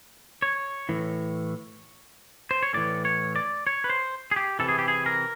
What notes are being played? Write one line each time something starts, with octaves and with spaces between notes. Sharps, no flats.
C#5
A2 E3
C5
C#5
A2 E3 D5
C#5
D5
C#5
B4
C5
G#4
G4
C3 E3 A4
G#4
G4
G#4
A#4